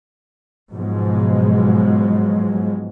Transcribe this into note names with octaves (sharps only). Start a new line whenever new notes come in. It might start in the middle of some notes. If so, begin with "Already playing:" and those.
G#2 B2 F3 F#3 G#3